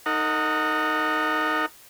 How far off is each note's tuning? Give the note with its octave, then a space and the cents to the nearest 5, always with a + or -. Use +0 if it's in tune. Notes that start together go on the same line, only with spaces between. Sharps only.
D#4 +0 A#4 -40 F#5 -10